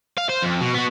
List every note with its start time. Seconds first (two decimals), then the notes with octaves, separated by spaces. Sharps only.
0.18 F5
0.30 C5
0.43 F2
0.61 B2
0.75 B3 F#4